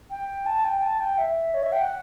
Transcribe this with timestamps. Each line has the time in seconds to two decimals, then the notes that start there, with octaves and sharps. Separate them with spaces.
0.10 G5
0.46 A5
0.65 G5
0.82 A5
1.00 G5
1.18 E5
1.54 C#5
1.63 E5
1.72 G5
1.82 F#5